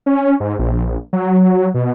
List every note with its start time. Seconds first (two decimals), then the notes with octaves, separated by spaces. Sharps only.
0.06 C#4
0.40 G#2
0.59 A#1
1.13 F#3
1.74 B2